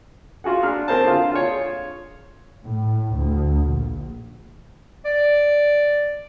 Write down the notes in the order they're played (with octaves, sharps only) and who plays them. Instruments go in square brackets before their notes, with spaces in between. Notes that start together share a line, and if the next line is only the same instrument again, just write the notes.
[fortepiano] F4 F#4 G#4 F#5
D4 F6
C4 G#4 A#4 C5 A5
D3 F4
F4 G#4 C#5
[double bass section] A2
D2
A#1
[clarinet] D5